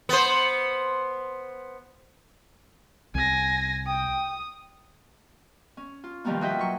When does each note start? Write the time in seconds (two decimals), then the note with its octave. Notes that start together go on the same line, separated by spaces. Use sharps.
0.09 B3 C5
3.15 C2 G#5 A#6
3.87 G5 D#6
5.77 C#4
6.04 F4
6.24 B2 D#3 F3 G3 A#3 B3
6.41 F4 F#4 D#5 E5 F#5 G5
6.59 F#3 C#6